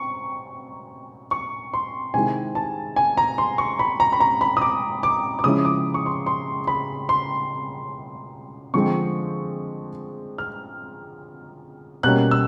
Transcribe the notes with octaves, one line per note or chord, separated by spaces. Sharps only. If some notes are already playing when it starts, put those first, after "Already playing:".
Already playing: C4 C#6
C#6
C6
C3 D#3 G#3 C4 E4 G#5
A5
G#5
A#5
C6
C#6
B5
A#5
B5
A#5
B5
D#6
D6
D6
D6
C#3 F3 G#3 C#4 E4 D#6
D6
C#6
C6
C6
B5
C6
D3 F3 G#3 C4 C#6
F6
B2 G3 A#3 C#4 F#6
E6